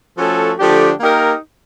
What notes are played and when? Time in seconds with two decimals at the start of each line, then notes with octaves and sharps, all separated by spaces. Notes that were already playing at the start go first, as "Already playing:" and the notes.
0.18 F3 A3 C#4 F#4 A4
0.59 D3 F3 A3 D4 G4
1.00 A#3 D#4 G4 A#4